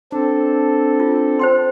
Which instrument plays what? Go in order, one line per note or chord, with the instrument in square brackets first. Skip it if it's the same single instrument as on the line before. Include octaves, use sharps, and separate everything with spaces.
[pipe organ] C4 A4 [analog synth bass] D4
[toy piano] F4
C5 G5 C6